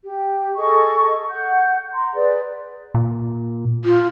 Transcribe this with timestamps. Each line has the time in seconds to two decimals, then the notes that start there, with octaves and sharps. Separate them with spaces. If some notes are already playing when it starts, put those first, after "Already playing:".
0.04 G4
0.57 G#4 A4 D#5 C#6
1.29 F#5 G6
1.93 A#5 C6
2.14 G#4 B4 D5
2.94 A#2
3.85 F4